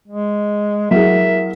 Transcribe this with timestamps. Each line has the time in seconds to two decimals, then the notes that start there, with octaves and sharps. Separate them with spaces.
0.08 G#3
0.91 F#3 E4 G#4 A#4 E5